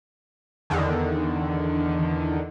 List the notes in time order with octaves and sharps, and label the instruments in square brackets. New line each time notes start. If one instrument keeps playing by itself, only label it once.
[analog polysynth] E2 D3 D#3